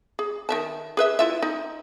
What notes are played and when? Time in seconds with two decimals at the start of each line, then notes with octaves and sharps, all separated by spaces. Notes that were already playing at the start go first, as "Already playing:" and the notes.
0.19 G#4
0.49 D#3 E5 A5
0.97 G#4 B4 E5
1.19 E4 F4 E5
1.42 D#4